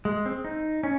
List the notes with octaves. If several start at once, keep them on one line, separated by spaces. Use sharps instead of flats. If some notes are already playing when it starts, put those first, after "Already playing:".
G#3
C4
D#4
C#4